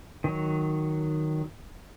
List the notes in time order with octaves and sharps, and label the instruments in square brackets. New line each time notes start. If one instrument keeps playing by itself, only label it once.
[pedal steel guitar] D#3 F#3